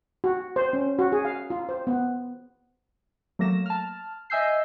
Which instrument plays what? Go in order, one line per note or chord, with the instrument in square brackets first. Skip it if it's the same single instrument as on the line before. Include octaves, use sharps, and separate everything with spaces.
[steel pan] F#4
C5
C#4
F#4
G#4
F5
F4
C5
B3
[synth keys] F#3 A3 A#3 A#6 E7
A5 F6
D#5 E5 G#5 E6 G6 C7